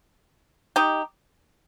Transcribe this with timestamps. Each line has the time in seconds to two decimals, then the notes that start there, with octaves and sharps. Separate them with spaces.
0.76 D#4 G4